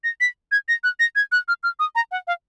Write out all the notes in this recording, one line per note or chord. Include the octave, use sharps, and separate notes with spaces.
A#6
B6
G#6
A#6
F#6
A#6
G#6
F#6
F6
F6
D#6
A#5
F#5
F5